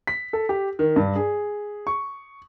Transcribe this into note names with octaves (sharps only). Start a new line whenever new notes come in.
B6
A4
G4
D#3
G2
G#4
C#6